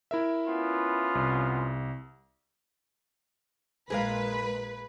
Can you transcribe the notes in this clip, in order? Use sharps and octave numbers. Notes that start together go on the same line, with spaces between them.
E4 A#4 E5
B3 C#4 F4
C2
A#1 G#3 G#4 A#4 B4 F5